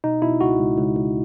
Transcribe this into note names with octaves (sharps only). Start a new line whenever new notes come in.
B2 D#4
B2 E4
C#2 F#4
C#2
C#2
C#2